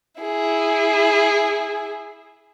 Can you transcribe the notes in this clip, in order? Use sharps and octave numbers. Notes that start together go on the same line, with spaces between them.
E4 G#4